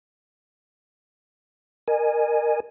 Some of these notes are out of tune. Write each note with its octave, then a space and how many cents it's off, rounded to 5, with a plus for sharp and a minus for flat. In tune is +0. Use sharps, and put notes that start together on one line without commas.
A#4 +0 D#5 -35 G#5 +0